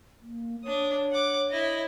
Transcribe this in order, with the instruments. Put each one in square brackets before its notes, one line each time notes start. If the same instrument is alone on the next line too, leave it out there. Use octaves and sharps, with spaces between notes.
[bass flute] A#3
[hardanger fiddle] D4 D#6 [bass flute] C#5
[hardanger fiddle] F#5 D6
E4 D#5